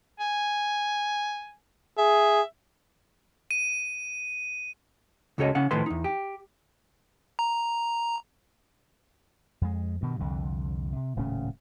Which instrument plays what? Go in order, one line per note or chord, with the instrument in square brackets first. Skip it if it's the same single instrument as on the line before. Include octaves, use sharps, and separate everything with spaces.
[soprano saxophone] G#5
[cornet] G#4 [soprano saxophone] E5
[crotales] D#7
[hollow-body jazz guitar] C#2 C#3 F#4 A4 C#5 D#5
C#3 C#4 F5 F#5
A2 D#3 F3 A4 B4 C6
E2 D#4
G4
[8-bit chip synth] A#5
[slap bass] F2 G#3
G2 B2 D#3
C2 F2 D3
C3
D#1 A2 C#3 C#4